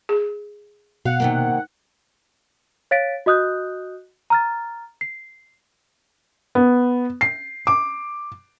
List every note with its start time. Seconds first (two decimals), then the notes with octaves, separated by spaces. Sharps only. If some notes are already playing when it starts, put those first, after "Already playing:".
0.09 G#4
1.05 B2 F5 F#5
1.20 C3 D#3 A#3
2.91 C#5 F5 A6 B6 D7
3.26 F#4 D#5 D#6 F#6 G6
4.30 A#5 F6 A6
5.01 C7
6.55 B3
7.21 C7
7.67 D6